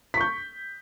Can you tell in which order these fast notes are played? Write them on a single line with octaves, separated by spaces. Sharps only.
B6 C#6 G6